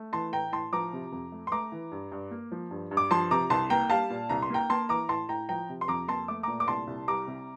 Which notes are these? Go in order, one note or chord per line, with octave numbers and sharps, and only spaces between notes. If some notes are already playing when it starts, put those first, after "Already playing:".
Already playing: A3
E3 A5 C6
A2 G5 A#5
A2 A5 C6
F3 A#5 D6
C3
F2
A3
C6
A3 A#5 D6
E3
G2
G2
A#3
F3
G2
G2
D6
F3 A5 C6
C3 A#5 D6
C2 A5 C6
A#3 G5 A#5
G3 F5 A5
A#2
C2 A#5
C6
A#3 G5 A#5
A#3 A5 C6
E3 A#5 D6
A2 A5 C6
A2 G5 A#5
F3 G5 A#5
C3
C6
F2 A#5 D6
A#3 A5 C6
A3 D6
A#2 A#5 D6
D6
C2 A5 C6
C2
G3 A#5 D6
C3